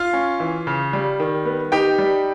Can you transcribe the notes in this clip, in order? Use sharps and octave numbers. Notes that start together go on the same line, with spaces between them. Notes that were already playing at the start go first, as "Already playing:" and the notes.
Already playing: F4 F5
C#4
E3
C#3
G3
D#3
B3
D#4 G4 G5
G3